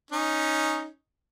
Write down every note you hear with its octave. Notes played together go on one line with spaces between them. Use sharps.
C#4 D#4